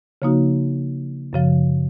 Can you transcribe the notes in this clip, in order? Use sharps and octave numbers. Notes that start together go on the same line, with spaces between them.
C#3 F3 A#3 D#4 F#4
F#2 C#3 F3